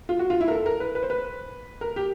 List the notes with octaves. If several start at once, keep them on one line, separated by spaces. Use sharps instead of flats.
F4
F#4
F4
E4
A#4
A4
A#4
B4
B4
C5
B4
A#4
G4